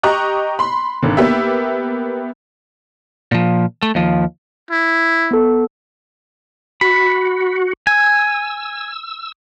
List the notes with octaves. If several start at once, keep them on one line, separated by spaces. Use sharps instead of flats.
G4 D#5 A#5 C#6 F#6
B5 C6
G#1 D3
A#3 B3 G4 E5
A#2 F3
A3
D#2 F3
E4
B3 A4
F#4 B5
G#5 E6